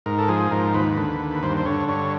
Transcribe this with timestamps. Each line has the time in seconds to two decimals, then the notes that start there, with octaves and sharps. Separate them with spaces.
0.06 G#2 A#4
0.18 A4
0.29 F3 G#4
0.51 G#2 A#4
0.74 D#2 B4
0.97 D3
1.20 D#2
1.43 G2 C5
1.57 C5
1.66 D3 C#5
1.88 G2 C#5